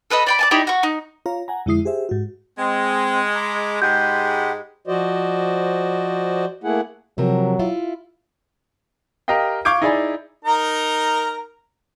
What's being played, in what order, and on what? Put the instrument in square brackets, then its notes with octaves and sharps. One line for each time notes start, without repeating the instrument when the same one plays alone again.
[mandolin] A4 B4 D#5 B5
D5 G5 B5
D5 G#5 A5
D#4 E4 G4 D5
F#4 C#6
D#4
[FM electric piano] F4 C#5 F5 A#5
F#5 G#5 A#5
F2 D3 G#3 E4 D#6 C7
G4 G#4 C5 E5
G#2 F#4
[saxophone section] G#3 [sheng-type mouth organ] C4
[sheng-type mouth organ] A#5 B5 D6
[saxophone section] G#2 G#3 [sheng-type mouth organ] G4 F#5 B5 [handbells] G6
[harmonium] F3 F#4 C5 D5 D#5
A3 A#3 E4 G#4 F#5
[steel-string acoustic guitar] C3 F3 A#4 [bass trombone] F#3
[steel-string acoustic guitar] E4 F4
[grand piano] G4 A#4 D#5 F5 G5
F5 C#6 D6 G6 G#6 D7
D#4 E4 G#4 D5 G#5 B5
[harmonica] D#4 A#4 A#5